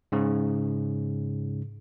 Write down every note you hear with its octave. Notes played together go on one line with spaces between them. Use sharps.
G#2 C#3